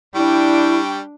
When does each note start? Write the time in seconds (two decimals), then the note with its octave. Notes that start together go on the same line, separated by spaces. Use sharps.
0.15 G3 D4 E4 G5 C#6